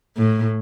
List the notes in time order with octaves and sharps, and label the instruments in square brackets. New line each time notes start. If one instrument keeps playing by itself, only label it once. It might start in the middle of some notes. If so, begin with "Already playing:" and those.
[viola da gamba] A2